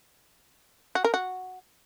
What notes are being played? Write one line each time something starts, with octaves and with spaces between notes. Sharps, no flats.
F#4
A#4
F#4